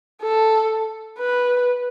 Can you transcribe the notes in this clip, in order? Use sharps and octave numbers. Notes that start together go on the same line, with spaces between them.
A4
B4